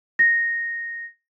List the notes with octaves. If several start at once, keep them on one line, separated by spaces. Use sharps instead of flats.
A#6